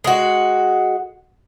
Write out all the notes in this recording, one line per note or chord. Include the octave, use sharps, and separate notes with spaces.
G#3 F#4